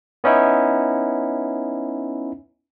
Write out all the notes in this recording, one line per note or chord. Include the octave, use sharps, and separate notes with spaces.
B3 C#4 D#4 E4